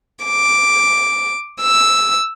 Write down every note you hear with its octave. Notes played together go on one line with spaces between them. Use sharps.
D6
E6